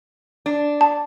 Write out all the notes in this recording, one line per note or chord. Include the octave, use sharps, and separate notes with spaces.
D4
A5